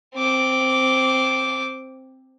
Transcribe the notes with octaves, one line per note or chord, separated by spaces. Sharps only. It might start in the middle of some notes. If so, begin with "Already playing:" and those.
C4 D6